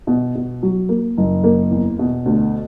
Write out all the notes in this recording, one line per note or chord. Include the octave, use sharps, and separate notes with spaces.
B2
B2
F#3
A#3
F#1
A#3
E2
B2
D2